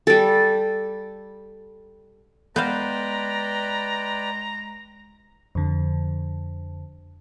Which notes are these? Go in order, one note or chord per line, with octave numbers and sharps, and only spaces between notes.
G3 A4
G#3 B3 B4 C5 D5 F5 G5 A#5
F2 D3